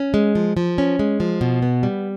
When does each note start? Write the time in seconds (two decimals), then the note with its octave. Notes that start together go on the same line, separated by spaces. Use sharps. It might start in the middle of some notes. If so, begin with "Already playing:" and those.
Already playing: C#4
0.14 G#3
0.35 F3
0.57 F3
0.78 C#4
0.99 G#3
1.20 F3
1.41 B2
1.62 B3
1.83 G3